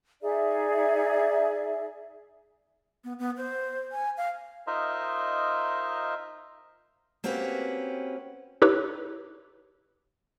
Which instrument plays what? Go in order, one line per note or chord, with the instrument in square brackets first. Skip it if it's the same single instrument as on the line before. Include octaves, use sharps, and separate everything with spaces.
[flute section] D#4 G#4 D5 E5
[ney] B3
B3
C5
G#5
F5
[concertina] D#4 F4 A#4 C5 D#5 E5
[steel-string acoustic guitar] A#3 C4 C#4 F#4 G4 B4
[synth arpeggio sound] D#4 E4 G4 B4 C#5